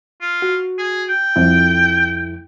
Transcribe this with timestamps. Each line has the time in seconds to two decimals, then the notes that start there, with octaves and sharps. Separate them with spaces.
0.21 F4
0.42 F#4
0.78 G#4
1.09 G5
1.36 C2 F2 E4